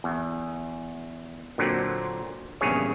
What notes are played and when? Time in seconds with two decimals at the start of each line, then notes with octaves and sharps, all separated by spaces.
0.04 E2
1.58 A#2 D3 F#3 C4
2.61 A#1 E2 G2 C#3 G#4 C#5